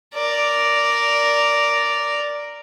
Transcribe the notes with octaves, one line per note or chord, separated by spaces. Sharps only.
A#4 D5